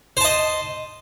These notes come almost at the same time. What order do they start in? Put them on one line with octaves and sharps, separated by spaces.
C5 A5 D#5